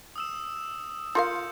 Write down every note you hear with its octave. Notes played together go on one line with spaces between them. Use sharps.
D#6 E6 E7
F4 A#4 F5 G6 C#7